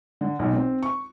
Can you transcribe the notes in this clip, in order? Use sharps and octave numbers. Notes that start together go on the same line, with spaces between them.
D3
B1
C4
C#6